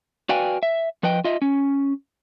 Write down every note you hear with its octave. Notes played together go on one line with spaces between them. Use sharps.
F#4 B4 D5 F5 G5 G#5
E5
F3 B4 D#5 G5
F4 D#5 E5
C#4